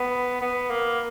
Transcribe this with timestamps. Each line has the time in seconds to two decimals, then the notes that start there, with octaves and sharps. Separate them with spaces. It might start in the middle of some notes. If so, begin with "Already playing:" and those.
Already playing: B3
0.41 B3
0.70 A#3